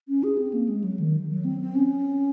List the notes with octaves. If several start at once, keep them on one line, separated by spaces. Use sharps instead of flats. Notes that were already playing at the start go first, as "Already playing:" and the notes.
C#4
G#4
C4
A#3
G#3
F#3
D#3
F#3
C4
C4
C#4